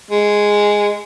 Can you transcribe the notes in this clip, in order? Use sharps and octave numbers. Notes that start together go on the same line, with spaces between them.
G#3